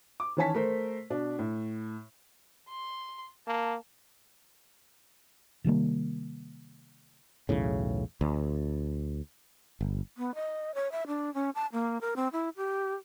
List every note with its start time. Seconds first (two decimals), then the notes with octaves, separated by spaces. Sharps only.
0.20 D6
0.37 D#3 E3 C#4 G#5 A5 B6
0.54 A3 A#4 C5
1.10 B2 D4
1.39 A2
2.69 C6
3.47 A#3 A5
5.64 C3 D#3 G3 A#3
7.49 B1 E2 A2 C#3
8.21 D2
9.81 G1
10.17 B3
10.35 D#5
10.74 C#5
10.92 E5
11.07 D4
11.34 C#4
11.55 A5
11.73 A#3
12.01 A#4
12.16 C4
12.33 E4
12.57 G4